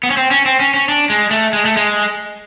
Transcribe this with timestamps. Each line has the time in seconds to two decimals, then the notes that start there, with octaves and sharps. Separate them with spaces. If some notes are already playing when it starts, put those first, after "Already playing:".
0.03 B3
0.10 C#4
0.17 C4
0.31 C#4
0.46 C4
0.60 C#4
0.74 C#4
0.89 D4
1.10 G#3
1.31 A3
1.53 G#3
1.65 A3
1.77 G#3